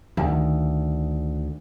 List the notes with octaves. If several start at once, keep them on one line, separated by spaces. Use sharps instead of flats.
D2 D#3